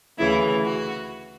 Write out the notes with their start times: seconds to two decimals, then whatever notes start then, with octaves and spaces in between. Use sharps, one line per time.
0.18 D2 C#3 E3 E4
0.64 F#4